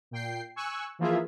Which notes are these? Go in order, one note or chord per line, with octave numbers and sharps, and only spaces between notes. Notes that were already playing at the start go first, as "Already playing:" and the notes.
A#2 G5 C7
G#5 C#6 E6 F#6
E3 F3 A#3 F4 G#4 E5